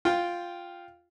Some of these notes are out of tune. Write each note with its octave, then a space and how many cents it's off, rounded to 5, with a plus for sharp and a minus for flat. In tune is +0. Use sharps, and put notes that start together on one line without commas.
F4 +0 G5 +0